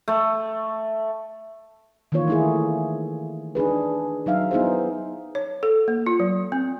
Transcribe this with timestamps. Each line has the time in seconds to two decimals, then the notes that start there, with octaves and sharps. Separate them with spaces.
0.08 A3
2.12 D#3 E3 A#3 F4 C#5
2.28 A3 E4 G#4
3.55 D4 D#4 G#4 B4
4.26 F#3 D#4 E5 F5
4.51 B3 D#4 E4 G#4 C5
5.35 C#5
5.63 A4
5.88 A#3
6.06 F4
6.20 F#3
6.52 C4